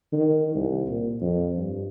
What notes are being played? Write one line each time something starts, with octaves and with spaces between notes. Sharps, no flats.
D#3
C2
A#2
F2
G2